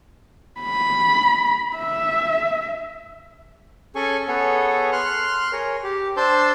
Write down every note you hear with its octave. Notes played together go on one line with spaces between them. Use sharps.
B5
E5
C#4 G#4 A4 G#5 C#6
B3 G#4 A4 C#5
C6 F6 F#6
G#4 A#4 C#5
G4
D4 C5 A5 C6 E6 G6